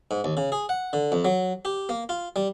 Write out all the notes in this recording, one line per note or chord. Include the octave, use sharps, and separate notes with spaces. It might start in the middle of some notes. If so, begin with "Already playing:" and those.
G#2
D#2
C#3
G#4
F#5
D3
F2
F#3
G4
A#3
F4
G3